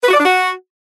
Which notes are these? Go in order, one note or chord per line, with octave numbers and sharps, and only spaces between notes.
B4
F#4
D5
D4
F#4